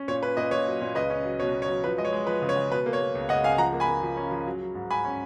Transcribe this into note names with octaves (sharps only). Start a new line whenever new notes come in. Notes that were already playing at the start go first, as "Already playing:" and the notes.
Already playing: C#4
A#2 C#5
C#4 B4
A#2 B4 D#5
A#2 C#5
F#3
A#2
C#2 B4 D#5
C#4
F#3
B2 C#5
B2
C#5
F#3
F3 B4
G#3 D#5
C#5
G#3
F3 B4
C#3
C#5
C#3
B2 B4
A#3
C#5
A#3
C#2
C#2 D#5 F#5
C#2 F5 G#5
F3 F#5 A#5
A#3
G#5 B5
A#3
F3
C#4
F3
F#3
F#3
G#2
G#2 G#5 B5
C#4